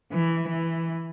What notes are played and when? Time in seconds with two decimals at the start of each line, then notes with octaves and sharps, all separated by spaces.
0.13 E3
0.49 E3